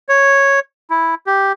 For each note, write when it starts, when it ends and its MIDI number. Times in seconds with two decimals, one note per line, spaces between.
0.09 0.60 73
0.90 1.15 64
1.27 1.52 67